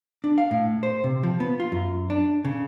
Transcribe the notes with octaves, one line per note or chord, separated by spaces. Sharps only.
D4
F5
A2
C5
C3
F3
B3
F4
F#2
D4
C#3